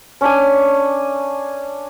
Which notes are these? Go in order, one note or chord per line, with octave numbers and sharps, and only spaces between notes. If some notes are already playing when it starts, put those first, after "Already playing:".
C#4 D4 G#5